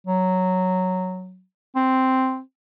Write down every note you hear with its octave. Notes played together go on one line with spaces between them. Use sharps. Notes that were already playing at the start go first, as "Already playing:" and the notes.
F#3
C4